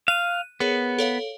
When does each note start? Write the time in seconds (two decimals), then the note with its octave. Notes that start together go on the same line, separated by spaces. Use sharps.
0.08 F5 F#6 D#7
0.60 B3 G#4 A#4 C#5
0.99 A4 C#5 F5